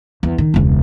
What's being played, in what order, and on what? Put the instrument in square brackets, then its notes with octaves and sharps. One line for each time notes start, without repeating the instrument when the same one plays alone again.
[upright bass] E2
D#3
E1 C#2